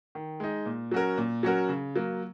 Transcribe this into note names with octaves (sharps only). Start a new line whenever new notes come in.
D#3
G#3 D#4
A#2
F#3 C#4 F#4 A#4
A#2
F#3 C#4 F#4 A#4
C#3
F#3 A#3